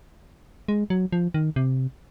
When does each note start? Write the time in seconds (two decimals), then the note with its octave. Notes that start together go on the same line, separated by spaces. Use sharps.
0.68 G#3
0.90 F#3
1.12 F3
1.34 D#3
1.56 C3